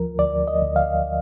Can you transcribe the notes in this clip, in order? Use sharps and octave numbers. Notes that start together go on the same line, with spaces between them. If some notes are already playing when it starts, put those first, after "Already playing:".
Already playing: D2 F3 A#4
D2 D5
D#5
D2
F5